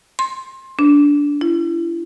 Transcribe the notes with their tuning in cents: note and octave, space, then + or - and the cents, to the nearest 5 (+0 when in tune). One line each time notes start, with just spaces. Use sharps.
C6 +20
D4 -15
E4 +35